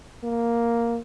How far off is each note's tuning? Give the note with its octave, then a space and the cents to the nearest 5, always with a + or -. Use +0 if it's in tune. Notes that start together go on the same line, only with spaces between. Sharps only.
A#3 +0